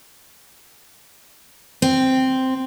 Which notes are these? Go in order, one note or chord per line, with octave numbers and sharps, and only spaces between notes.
C4